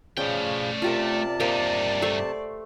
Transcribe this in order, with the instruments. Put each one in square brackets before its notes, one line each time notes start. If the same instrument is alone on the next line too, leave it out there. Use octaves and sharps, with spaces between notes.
[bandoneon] C#3 F3 [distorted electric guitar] A3 G5 [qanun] C#4 [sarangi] D5
[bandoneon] C3 A5 [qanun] F4 G4 A#4
[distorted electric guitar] G2 D#4 [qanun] A#3 G4 C5 [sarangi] D5
[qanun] A3 C5 C#6